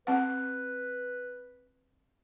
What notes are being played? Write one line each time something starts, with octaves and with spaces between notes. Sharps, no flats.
C4 B4 F#5